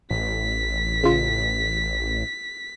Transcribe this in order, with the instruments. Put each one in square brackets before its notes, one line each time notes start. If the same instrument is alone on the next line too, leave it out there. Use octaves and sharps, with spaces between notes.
[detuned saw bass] A1 [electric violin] B6
[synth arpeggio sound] C#3 F4